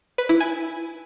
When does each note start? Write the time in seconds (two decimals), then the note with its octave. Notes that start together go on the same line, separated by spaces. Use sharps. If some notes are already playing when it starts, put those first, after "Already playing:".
0.18 B4
0.29 E4
0.40 G#5